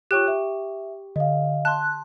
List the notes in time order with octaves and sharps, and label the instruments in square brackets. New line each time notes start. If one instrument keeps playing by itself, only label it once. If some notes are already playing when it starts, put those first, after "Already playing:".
[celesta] F4 C#5 F#6 [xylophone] G4 G5 C#6
[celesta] E5
[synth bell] D3 [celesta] D#5 F5
[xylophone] A5 C6 [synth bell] F#6